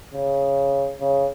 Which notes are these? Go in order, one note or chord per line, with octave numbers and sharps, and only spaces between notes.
C#3
C#3